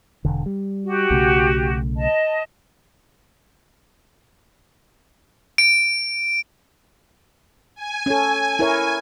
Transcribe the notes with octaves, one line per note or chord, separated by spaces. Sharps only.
E1 D3
G3
F#4 G4
B1 C#3 A3
D#5 A5
D7
G#5
C#4 A4
E4 A#4 C#5